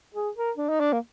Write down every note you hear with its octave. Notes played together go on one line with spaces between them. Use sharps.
G#4
A#4
D4
D#4
D4
A#3